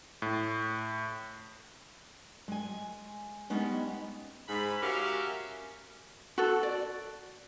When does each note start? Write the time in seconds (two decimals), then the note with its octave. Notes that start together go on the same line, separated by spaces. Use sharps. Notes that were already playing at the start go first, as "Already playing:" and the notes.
0.22 A2
2.48 G#3 G#5
3.50 G3 G#3 B3 C#4 D#4
4.48 G#2 B5
4.82 C#4 F#4 G4 A#4 E5 F5
6.38 F#4 A4
6.63 D5